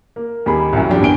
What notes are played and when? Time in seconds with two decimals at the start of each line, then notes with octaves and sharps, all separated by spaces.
0.16 A#3
0.46 D#2 G3 G#4 B5
0.73 C2 F#2
0.90 F3 G3 D4 G4
1.02 G1 G#5 D7 G7